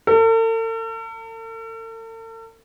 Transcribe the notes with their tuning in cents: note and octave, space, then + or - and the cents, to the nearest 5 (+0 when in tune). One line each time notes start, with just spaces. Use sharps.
A4 +45